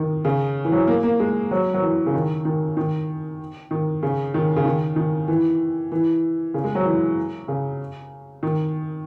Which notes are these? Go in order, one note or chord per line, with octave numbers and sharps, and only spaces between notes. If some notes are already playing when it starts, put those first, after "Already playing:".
Already playing: D#3
C#3
E3
F#3
A#3
A#3
G#3
F#3
F#3
E3
C#3
D#3
D#3
D#3
D#3
C#3
D#3
C#3
D#3
D#3
E3
E3
C#3
G#3
F#3
E3
C#3
D#3